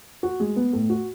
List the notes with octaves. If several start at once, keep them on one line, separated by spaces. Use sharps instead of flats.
F#4
G#3
B3
A2
F#4